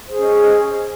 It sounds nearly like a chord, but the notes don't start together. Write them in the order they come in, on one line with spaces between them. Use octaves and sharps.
C5 G#4 C#4 D#5